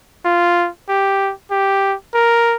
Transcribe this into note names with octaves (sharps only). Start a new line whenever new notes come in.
F4
G4
G4
A#4